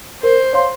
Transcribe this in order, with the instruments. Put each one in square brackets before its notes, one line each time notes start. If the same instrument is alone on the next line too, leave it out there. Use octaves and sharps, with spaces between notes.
[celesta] A#4 [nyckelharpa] C5
[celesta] C#5 F5 C6